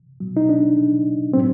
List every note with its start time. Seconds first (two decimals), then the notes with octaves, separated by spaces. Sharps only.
0.20 B2 F#3
0.37 D#4
0.49 D4
1.33 A2 F#3 C4